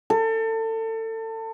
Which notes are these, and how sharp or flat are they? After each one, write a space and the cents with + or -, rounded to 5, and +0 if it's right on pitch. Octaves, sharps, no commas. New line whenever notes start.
A4 +30